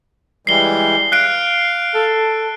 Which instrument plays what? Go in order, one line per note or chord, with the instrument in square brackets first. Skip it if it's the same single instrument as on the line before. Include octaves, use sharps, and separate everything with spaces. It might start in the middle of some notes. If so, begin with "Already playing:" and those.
[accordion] E3 G3 G#3 [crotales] C7 G7
[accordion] F5 [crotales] F#6 C7 D7
[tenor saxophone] A4